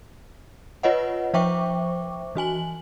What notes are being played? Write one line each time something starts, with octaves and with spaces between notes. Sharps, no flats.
F4 B4 C#5 D#5 F#5
F3 C5 E5 G5 C#6 D6
E3 F#4 G#5 F#7